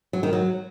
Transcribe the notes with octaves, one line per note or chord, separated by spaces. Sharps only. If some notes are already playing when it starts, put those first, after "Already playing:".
F#3
D#3
F#3